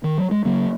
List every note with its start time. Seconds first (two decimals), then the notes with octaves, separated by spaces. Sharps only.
0.04 D#3
0.18 F#3
0.31 G#3
0.45 C#3 F#3 A#3